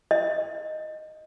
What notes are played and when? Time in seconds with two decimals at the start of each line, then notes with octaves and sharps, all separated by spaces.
0.11 D#5